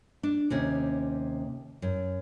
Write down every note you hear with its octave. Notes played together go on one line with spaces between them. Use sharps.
D4
D#2 C3 C#4
F#2